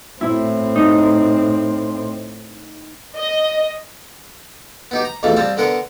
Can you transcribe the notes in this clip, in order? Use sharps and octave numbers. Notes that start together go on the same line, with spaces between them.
A2 C4 E4
D#4
D#5
B3 D#4 G4
A#5
B1 F2 G#2 E3 A3 F5
G3 C4 F5 A5
D3 B3 A#4 F#5 C6